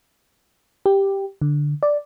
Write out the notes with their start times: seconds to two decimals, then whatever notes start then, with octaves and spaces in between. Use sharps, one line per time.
0.86 G4
1.41 D3
1.83 D5